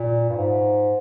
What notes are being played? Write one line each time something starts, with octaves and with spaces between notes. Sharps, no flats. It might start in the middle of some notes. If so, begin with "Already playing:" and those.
Already playing: A#2
G2
G#2